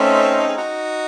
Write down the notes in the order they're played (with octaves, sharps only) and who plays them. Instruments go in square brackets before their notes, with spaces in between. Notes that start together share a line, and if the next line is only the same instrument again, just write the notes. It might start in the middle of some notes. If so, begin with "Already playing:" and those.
Already playing: [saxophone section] A3 C#4 [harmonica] C4 D#4
[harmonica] A4
G#4
D#4 F#4